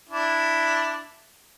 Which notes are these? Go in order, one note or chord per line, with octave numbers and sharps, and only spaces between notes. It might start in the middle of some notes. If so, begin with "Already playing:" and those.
D4 E4